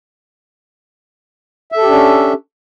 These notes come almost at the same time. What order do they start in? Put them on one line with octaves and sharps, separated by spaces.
E5 A4 G4 D4 C#4